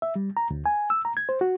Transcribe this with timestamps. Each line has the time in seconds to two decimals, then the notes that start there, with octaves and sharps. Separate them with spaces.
0.02 E5
0.16 G3
0.37 A#5
0.51 D2
0.66 G#5
0.90 E6
1.05 A#5
1.17 G#6
1.29 C5
1.41 F#4